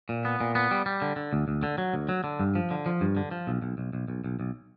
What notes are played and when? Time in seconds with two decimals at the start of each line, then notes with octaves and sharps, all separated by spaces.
0.09 A#2
0.25 B3
0.41 A#2
0.55 B3
0.71 G3
0.86 G3
1.02 D3
1.16 D3
1.33 D2
1.48 D2
1.63 D3
1.78 F#3
1.94 D2
2.09 F#3
2.24 D3
2.40 G2
2.55 F3
2.71 D3
2.86 F3
3.01 G2
3.17 D3
3.31 F3
3.47 B1
3.62 B1
3.78 B1
3.93 B1
4.08 B1
4.24 B1
4.40 B1